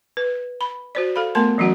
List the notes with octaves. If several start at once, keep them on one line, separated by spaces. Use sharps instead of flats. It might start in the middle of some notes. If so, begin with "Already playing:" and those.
B4
B5
F#4 C5 D5
A4 F5 B5
A3 B3 A#4 A5 C6
E3 F#3 C#4 F#4 F#5